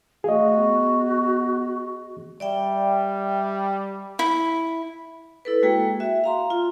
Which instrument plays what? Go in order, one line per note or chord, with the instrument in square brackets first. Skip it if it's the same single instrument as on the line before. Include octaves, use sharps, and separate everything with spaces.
[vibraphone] A3 F5 [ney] F#4 [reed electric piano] G#4 D#5
[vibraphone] B3
[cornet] G3 [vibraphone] D5 E5 G5
[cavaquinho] E4
[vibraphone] E4 A4 B4
G#3 A#3 F#4 G#4 G5
F#4 E5
F5 A#5 C6
F4